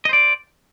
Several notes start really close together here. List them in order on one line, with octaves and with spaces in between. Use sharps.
D#5 C5 D5